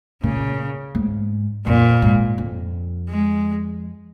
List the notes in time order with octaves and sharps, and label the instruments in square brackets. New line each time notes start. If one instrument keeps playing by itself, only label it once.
[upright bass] A#2 [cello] C#3
[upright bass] G#2
[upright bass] F2 [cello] A#2
[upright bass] G#2
F2
[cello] G#3